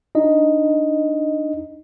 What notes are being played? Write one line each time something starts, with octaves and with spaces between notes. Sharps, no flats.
D4 D#4 D#5